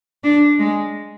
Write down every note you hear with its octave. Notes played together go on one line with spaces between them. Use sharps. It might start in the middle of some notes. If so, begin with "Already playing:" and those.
D4
G#3